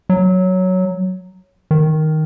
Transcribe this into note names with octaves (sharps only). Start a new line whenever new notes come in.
F#3
D#3